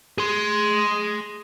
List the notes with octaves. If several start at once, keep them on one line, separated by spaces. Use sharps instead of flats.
G#4 C6